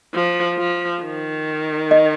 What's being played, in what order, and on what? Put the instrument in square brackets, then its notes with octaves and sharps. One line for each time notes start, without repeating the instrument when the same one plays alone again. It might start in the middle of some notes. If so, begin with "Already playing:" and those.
[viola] F3
F3
D#3
[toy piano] D#5